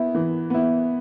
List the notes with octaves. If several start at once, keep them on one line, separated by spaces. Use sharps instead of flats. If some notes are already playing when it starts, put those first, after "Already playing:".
Already playing: B3 E4
E3
B3 E4